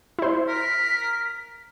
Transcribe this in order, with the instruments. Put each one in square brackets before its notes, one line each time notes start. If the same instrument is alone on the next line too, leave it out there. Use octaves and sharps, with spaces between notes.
[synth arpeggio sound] E4 C5
[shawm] A#4 [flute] B6